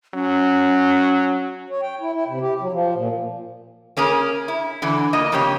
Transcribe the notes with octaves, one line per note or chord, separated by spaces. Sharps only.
F#3 C#4
C#5
G5
E4
E4
C3
G4
F#3
F3
A#2
A#3 C#4 G#4 A#4
E4
D3 E3
A#3 F4 D#5
F2 C#3 A#3 G4 C#5